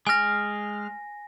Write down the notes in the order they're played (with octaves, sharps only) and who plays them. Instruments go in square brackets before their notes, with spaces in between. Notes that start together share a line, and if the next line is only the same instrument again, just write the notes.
[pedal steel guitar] G#3 F6 [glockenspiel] G#5 A#6